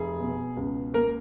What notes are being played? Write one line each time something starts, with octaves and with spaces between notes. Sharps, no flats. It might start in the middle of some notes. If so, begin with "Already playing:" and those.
Already playing: F1 G#4
B2
C#2
A#3 A#4